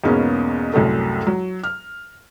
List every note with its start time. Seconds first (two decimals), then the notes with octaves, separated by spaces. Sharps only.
0.04 E2 G#2 B2 A#3 B3 C#4
0.74 C2 F#2 A2 A3
1.27 F#3
1.64 F6